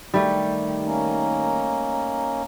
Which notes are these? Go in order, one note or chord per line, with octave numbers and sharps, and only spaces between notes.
D#3 G3 A3 G4
A#3 C#4 D#4